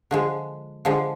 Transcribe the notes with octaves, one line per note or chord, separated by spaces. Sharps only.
D3 F3 G#3
D3 F3 G#3